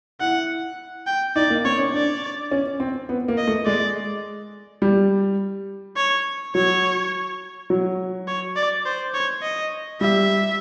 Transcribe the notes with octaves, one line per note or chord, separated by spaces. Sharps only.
E4 F#5
G5
D#4 D5
A#3
C4 C#5
C#4
D4 D5
C#4
C4
B3
A#3
D#5
A3
G#3 D5
G3
C#5
F#3 C#5
F#3
C#5
D5
C5
C#5
D#5
G3 E5